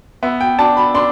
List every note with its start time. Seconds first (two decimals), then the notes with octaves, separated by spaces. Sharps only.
0.23 B3 E5
0.41 G5
0.59 D4 A5
0.77 B5
0.94 D4 C6